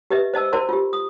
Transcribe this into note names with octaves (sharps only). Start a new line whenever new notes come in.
G4 B4 D#5 E5
C5 D#5 A5 E6
E4 A#4 C5 D5 A5 C6
F4 G4
D#6